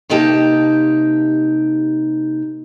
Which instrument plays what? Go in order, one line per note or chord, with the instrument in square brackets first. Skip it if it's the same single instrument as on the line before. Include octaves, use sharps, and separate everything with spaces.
[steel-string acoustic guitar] C3 A#3 D#4 G4 A5